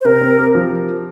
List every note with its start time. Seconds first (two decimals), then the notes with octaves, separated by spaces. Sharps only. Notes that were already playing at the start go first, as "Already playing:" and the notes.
0.01 C5
0.05 C3 A#4
0.21 C4
0.38 G4
0.55 F3